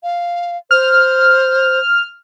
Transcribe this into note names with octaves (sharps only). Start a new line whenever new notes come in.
F5
C5 F6